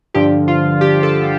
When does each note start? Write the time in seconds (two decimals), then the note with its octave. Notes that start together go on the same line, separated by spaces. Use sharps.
0.14 G2 D3 F3 G4
0.48 F4
0.81 G4
1.03 A4